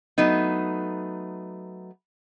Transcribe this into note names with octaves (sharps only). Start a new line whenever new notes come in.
F#3 A3 B3 D#4